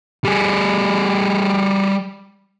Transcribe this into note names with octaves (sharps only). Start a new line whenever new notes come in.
G3 G#4